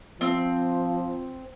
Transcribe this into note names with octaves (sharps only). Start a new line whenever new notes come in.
F3 C4